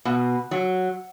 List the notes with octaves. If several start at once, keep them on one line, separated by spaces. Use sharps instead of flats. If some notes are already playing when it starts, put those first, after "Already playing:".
B2
F#3